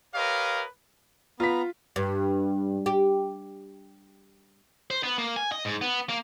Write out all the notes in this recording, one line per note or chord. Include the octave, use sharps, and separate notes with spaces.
G4 A#4 B4 C#5 D#5 F5
B3 F4 A#5 B6
G2
G4
C5
B3
A#3
G#5
D#5
G#2
B3
A#3